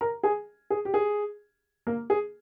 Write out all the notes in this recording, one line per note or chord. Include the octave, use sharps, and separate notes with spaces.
A#4 A#5
G#4 G#5
G#4
G4
G#4
A#3 A#4
G#4